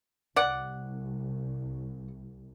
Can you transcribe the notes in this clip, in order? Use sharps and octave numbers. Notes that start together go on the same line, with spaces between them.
C2 D5 F#5